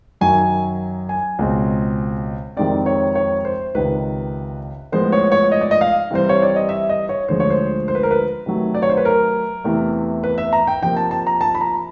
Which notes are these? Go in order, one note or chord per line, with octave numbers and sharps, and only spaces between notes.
F#2 D#3 F#3 G#5
G#5
C#2 B2 G#3 C4
F2 C3 D#3 G#3 C4 D5
C#5
C#5
C5
C#2 C3 D#3 B4
A2 F3 G#3 B3 C5
C#5
C#5
D#5
D5
D#5
F5
C3 E3 G3 C4 C5
C#5
D5
D#5
E5
D#5
C#5
D2 D3 F3 G#3 C5
C#5
C5
C5
B4
A#4
B4
C3 D#3 F#3 A3
D5
C#5
C5
B4
A#4
E2 C3 E3 A3
B4
E5
A#5
G5
C3 F3 A#3 G5
A5
A5
A#5
A5
B5
A#5